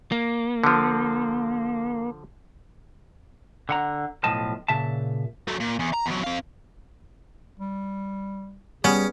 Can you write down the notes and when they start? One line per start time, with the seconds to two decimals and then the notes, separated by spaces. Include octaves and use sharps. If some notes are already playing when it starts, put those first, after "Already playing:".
0.12 A#3
0.64 D3 F3
3.69 D3 F#5 A#5
4.24 B1 A2 F3 D#5 A5
4.68 A#2 C#3 E5 A5
5.48 F#3 A3
5.60 A#2
5.79 E2
5.93 A#5
6.06 E2 F#3
6.24 C4 F5
7.60 G3
8.84 G3 B3 C#4 G#4